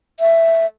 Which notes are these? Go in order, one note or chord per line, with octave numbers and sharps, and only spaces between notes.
E5